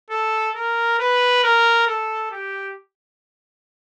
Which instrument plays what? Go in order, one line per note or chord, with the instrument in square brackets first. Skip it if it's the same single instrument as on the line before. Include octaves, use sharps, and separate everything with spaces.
[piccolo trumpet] A4
A#4
B4
A#4
A4
G4